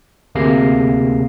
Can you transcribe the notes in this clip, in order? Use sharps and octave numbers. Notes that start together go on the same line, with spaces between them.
D2 C3 A#3 G#4 A#6 C7